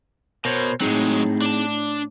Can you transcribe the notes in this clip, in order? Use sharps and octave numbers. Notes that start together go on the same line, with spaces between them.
B2 A#4 C5 C#5
A2 F#3 G#3 C4 D#4 G#4
D4 A5